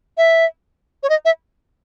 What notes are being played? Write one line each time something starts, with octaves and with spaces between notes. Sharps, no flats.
E5
C#5
D#5
E5